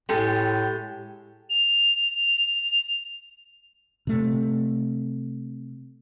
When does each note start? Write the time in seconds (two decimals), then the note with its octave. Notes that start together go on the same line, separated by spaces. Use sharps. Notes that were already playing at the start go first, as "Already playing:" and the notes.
0.09 A2 G#3 G4 A4
1.50 F7
4.07 C3 A3